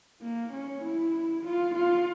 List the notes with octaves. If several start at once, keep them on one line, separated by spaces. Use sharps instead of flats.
A#3
C#4
E4
F4
F4